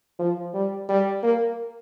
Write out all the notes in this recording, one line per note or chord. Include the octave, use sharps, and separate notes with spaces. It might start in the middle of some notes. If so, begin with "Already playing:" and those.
F3
G3
G3
A#3